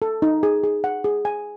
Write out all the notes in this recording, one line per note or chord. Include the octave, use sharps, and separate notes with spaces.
A4
D#4
G#4
G#4
F#5
G#4
G#5